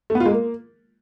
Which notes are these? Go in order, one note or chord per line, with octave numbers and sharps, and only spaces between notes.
A3
B3
F4
G#3
A#3